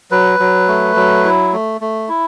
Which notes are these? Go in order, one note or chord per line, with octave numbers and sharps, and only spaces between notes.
F#3 B4
F#3
A3
F#3
E4
A3
A3
E4